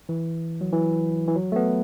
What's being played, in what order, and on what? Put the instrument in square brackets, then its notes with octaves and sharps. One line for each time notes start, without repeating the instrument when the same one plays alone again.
[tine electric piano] E3
F#3
E3
E3
F#3
A3
B3